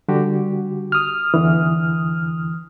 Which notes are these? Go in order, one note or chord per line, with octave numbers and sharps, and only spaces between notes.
D3 G3 F#4 G4
D#6 F6
E2 D3 E3